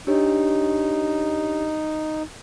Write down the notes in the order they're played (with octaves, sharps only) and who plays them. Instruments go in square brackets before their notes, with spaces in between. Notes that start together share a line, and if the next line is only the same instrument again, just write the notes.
[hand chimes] D4 G4 C#5 [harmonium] D#4